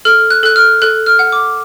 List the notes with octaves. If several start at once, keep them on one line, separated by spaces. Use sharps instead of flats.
A4 F6
F#6
A4 F#6
F6
A4 F#6
F6
F#5
D6